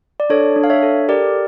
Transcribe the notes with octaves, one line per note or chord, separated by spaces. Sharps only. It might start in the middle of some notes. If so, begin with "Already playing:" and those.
D5
D4 A4 C#5
D4
F5
C#5 E5
A4
G4 A#4 D5